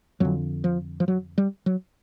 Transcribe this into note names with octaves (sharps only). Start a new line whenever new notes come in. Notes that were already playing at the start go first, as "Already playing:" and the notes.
F2 D3 F#3
F3
F3
F#3
G3
F#3